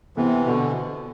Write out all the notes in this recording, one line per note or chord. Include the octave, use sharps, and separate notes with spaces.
C3 E3 B3
B2 D3